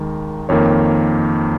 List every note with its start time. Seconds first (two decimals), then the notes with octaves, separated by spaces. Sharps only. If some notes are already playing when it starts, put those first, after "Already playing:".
Already playing: D#2 D#3 G#3 A#4
0.49 F2 D#3 A#3 C#5